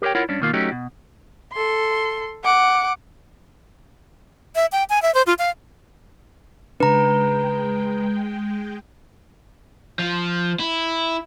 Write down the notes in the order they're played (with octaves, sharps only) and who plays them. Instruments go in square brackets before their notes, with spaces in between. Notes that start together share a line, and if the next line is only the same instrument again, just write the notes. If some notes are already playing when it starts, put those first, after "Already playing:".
[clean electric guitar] G4 A#4 B4 C#5 G5
E4 F4 A#4 C#5 F#5
G2 C#4 D4
B2 D#3 A#3 F4
F#3 A3 C#4 D#4 F#4 G4
B2
[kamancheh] A4 C6
F#5 D6
[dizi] E5
G5
G#5
E5
C5
F4
F5
[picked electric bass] C#3 D4 [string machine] G#3 G5 [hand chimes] B4 A#5
[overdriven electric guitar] F3
E4